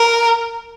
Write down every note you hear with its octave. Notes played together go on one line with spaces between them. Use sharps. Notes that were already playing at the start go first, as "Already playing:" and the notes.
Already playing: A#4